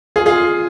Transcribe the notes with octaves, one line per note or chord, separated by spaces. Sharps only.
F4 G#4
F4 G#4